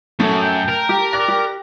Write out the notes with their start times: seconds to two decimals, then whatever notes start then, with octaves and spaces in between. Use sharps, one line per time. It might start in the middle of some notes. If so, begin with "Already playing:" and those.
0.20 F#2 A3
0.41 G5
0.69 A#4
0.89 G4
1.13 D5 F#6 A#6
1.28 G4